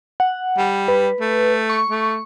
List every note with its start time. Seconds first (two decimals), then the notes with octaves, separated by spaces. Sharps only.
0.20 F#5
0.57 G3
0.88 B4
1.21 A3
1.70 C#6
1.89 A3